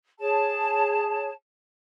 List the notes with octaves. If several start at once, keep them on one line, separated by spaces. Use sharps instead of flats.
G#4 C#5 A5